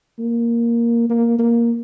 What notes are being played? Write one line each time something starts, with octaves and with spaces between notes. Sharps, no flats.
A#3
A#3
A#3